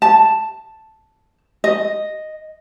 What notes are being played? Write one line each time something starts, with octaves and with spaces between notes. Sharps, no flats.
A5
D#5